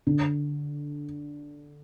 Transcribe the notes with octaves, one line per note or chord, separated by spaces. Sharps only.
D3